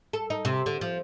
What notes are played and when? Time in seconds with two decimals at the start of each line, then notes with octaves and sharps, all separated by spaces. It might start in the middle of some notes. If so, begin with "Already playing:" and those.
0.13 A4
0.30 D#4
0.45 C3
0.66 D3
0.81 F3